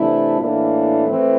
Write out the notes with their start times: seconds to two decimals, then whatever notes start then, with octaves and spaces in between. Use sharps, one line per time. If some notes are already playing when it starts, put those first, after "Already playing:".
Already playing: C3 E3 A3 D4 E4
0.40 A2 E3 A#3 D4 E4
1.07 E3 A3 C4